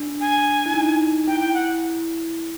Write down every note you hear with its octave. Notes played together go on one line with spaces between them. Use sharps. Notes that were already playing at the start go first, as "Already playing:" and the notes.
Already playing: D4
G#5
E4
D#4
E4 G5
G5
F#5